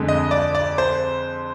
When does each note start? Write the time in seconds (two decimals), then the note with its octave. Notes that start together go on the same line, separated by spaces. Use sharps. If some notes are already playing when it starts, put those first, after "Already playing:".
Already playing: F2 D3 G#3
0.08 D#5
0.31 D5
0.55 D5
0.78 C5